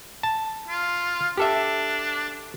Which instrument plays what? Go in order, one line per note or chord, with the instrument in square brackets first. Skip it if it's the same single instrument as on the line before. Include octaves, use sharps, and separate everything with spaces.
[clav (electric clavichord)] A5
[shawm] F4
[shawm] D4 [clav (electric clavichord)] G4 A4 E5